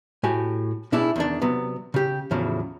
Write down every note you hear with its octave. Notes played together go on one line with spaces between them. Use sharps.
A2 F#4 G4 G#5
B2 D4 E4 G4 G#4
E2 D#3 D4
C3 F#3 B3
C#3 G4
E2 A2 C#3 F3 F#3